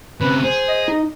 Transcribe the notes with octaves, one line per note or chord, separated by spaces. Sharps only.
C#3 C4 B4
G#4 C5
D#5
D#4